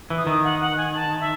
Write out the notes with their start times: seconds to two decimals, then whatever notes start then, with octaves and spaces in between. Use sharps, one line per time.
0.10 E3
0.18 D#6
0.27 D#3
0.43 F#5
0.61 F#5
0.77 G#5
0.95 A5
1.20 E5